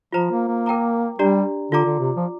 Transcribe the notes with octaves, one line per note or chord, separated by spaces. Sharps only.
F3 F4 C5 A#5
A#3
A#3
A#4 G5 A#5 D6
G3 D4 G4 D5 A#5
D3 F4 D5 A#5 D6
D3
C3
F3